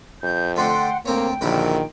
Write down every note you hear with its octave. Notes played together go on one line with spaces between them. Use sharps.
F2 G6
D3 A3 D4 F#5 G5 C6
D2 A#3 C4 C#5 G5
A#1 D3 D#3 F#3 E4